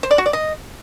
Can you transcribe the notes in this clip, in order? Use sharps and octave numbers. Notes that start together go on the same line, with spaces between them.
C5
D5
F#4
D5
D#5